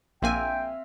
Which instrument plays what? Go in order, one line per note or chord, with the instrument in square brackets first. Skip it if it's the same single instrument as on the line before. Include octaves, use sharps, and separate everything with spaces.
[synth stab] A#1 A#3 G#5 [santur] C4 E5 F5 [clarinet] G5